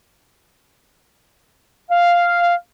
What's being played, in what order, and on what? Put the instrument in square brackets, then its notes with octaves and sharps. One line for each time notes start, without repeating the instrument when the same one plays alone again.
[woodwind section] F5